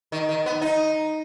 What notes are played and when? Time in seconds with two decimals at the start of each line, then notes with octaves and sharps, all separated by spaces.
0.12 D#3
0.29 D#3
0.46 B3
0.61 D#4